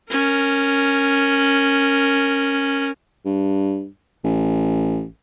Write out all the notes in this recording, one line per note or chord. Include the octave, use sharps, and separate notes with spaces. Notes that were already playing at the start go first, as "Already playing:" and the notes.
C#4 A#4
G2
A1